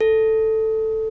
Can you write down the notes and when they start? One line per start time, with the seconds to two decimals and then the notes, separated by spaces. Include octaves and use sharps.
0.01 A4